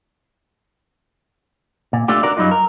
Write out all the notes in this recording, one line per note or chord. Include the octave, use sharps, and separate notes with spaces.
A#2
A3 D4 F4 G4
D4 F#4 A#4 D5
F#2 F#3 G3 D#4 F4
A#4